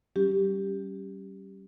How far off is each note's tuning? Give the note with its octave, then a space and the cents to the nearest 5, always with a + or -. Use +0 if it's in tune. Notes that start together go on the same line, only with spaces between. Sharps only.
G3 -30 C#4 +0 G4 +0